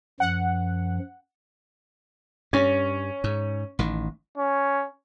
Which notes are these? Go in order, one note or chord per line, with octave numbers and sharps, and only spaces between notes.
F#2 F3 F#5
G2 C#4
G#2
A1 D#3
C#4